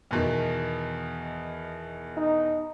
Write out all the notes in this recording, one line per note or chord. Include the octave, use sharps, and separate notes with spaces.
E2 B2 D#3
D#4